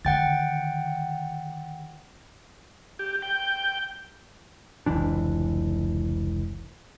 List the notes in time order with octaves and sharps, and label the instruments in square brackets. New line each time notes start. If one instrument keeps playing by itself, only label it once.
[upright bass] D3 D#3 [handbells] F#5 G5 A6
[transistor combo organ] G4
G5
[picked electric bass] F1 C#2 E3 D4